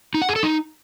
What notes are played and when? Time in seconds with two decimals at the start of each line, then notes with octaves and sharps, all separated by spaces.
0.14 D#4
0.22 F#5
0.29 G#4
0.36 A4
0.43 D#4